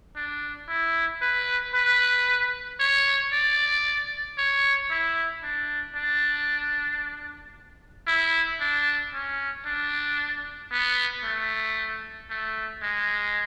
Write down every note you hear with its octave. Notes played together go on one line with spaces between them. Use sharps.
D4
E4
B4
B4
C#5
D5
C#5
E4
D4
D4
E4
D4
C#4
D4
B3
A3
A3
G#3